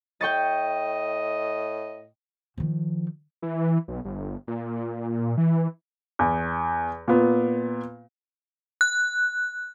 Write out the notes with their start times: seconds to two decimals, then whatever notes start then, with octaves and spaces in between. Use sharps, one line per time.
0.21 A2 D#5 G5 C#6 A6
2.58 D#3 F3
3.42 E3
3.88 B1
4.05 G1
4.48 A#2
5.37 E3
6.19 E2
7.08 A#2 B3
8.81 F#6